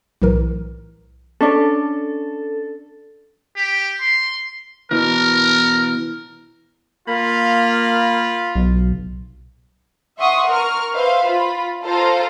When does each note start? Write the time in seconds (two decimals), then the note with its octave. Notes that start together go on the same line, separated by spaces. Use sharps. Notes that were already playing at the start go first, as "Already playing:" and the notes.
0.22 B1 A2 E3 A#4
1.41 C#4 D4 A4 D5
3.56 G4
4.00 C6
4.91 B2 E3 A#4
7.08 A#3 F4 B5
8.55 B1
10.19 E5 F#5 C6 C#6 D#6
10.48 A#4 C#6 F6
10.95 B4 C5 E5 F5 C6
11.26 F4 B5
11.85 F4 A4 C5 F5 A#5